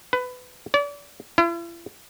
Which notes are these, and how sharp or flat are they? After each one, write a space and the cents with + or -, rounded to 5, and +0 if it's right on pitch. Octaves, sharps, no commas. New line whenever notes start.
B4 +20
D5 -35
E4 +45